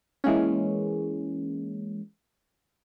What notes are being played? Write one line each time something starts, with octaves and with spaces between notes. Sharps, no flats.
E3 G#3 A#3 C#4